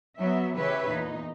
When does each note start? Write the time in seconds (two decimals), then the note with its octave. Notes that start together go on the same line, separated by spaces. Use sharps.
0.19 F#3 B3 E5
0.56 C#3 E3 G4 B4 C#5 E5
0.87 E2 A#2 D#4